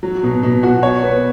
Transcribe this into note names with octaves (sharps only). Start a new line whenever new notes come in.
F#3
B2
B2
F#4
C#5
B3